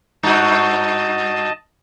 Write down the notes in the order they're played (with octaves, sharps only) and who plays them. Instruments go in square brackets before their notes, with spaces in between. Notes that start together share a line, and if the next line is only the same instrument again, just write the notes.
[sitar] G2 F#4 [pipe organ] D#5 A5